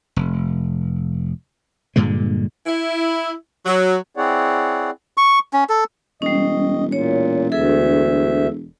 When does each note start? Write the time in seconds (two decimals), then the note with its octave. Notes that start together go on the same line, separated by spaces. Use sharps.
0.16 F1
1.96 G2 A#2 D3 G#3
2.66 E4
3.65 F#3
4.17 C4 E4 G#4 C#5 D5 F#5
5.17 C#6
5.53 C#4
5.69 A4
6.22 E1 G3 C#4 D#5
6.92 A#2 C#5
7.52 D2 G#4 A4 E5